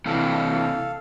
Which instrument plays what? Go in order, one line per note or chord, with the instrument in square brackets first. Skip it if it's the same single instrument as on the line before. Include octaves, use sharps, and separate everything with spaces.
[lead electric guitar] C3 E3 [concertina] A4 F5